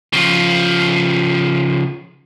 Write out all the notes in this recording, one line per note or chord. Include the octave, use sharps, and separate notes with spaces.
C#3 F3